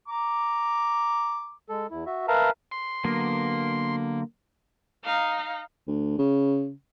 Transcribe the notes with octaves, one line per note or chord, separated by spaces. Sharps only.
A#5 D6
G#3 A4
E2 E4
F#4 E5
A#4 B4 E5 F5 A5 A#5
C6
D3 F#3 A#3 B3
D#4 F5
D2
C#3